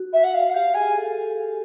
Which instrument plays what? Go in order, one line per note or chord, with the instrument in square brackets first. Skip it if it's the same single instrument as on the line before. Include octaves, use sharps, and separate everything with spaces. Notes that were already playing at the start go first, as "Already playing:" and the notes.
Already playing: [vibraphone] F#4
[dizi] E5
F#5
F5
F#5
[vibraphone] G4 [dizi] F5
[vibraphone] G#4 [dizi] G#5
[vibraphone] A4